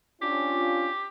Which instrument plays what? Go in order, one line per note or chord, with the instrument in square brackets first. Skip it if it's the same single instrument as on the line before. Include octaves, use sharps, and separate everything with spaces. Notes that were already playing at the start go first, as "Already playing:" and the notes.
[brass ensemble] C#4 D4 F4 [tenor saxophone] G4